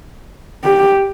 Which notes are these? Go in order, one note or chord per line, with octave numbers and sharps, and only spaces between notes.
G4